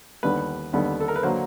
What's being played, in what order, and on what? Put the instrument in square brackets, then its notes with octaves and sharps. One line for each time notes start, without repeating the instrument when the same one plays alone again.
[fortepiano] D#2 D3 G3 B3 B4
D#2 D3 G3 B3
A4
A#4
B4
D3 F#3 A#3 C5